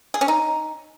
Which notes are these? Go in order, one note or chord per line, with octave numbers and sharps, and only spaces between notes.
G#4
C#4
D#4